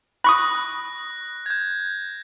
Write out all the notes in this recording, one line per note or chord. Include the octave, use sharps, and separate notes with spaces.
B5 C#6 D#6 F#6 A#6
G6 G#6